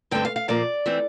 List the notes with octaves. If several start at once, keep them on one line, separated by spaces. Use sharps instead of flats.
G2 D3 A3 C4 G5
F5
F5
A#2 F3 A#3 D5
E3 A3 C4